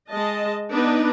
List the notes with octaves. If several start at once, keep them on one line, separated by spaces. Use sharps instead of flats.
G#3 D#5 A5
B3 D4 D#4 B4